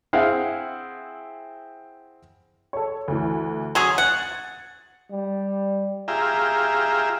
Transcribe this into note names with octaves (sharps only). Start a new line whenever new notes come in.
C4 E4 G#4 F5 F#5
A4 C#5
D2 E3
F#3 C#4 G#4 C6
F#5 G#6 A6
G3
F4 G4 G#4 E5 A#5